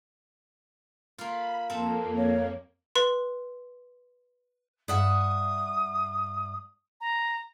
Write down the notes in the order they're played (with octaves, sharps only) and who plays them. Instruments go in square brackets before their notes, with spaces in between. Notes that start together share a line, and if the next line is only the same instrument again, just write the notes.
[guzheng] A#3 F4 [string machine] B5
[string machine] F2 A#3 [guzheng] C4 A4
[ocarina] C#5
[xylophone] B4 C6
[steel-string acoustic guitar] G2 E5 F#5 [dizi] D#6
[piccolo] A#5